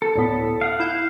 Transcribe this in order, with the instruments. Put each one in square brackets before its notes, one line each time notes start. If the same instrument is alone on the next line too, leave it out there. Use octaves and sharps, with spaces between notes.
[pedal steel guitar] A4
[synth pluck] D2 A2 B3
[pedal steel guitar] F5 F#5
[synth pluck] E4 G6 E7